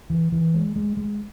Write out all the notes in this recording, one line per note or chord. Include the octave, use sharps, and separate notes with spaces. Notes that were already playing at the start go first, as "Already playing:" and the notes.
E3
E3
G#3
G#3
G#3